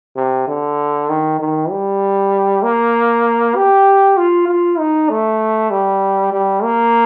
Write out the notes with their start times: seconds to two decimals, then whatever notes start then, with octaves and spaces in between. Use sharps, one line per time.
0.16 C3
0.48 D3
1.09 D#3
1.40 D#3
1.71 G3
2.63 A#3
3.56 G4
4.17 F4
4.48 F4
4.79 D#4
5.09 A3
5.71 G3
6.33 G3
6.63 A#3